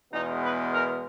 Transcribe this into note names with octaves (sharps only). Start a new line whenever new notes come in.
E2 B2 G#3 B3 D#4
B4
A#4